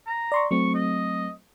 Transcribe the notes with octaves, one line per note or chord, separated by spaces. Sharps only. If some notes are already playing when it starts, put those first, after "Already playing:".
A#5
D5 C6 C#6
F#3 A3 C4 C#6
D#5